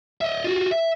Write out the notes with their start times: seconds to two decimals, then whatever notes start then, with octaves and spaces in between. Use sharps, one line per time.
0.21 D#5 E5
0.44 F4 F#4
0.71 E5